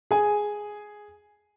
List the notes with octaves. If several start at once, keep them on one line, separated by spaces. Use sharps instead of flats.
G#4 G#5